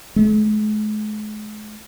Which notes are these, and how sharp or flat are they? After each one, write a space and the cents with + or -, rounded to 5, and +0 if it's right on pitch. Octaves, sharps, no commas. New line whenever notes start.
G#3 +45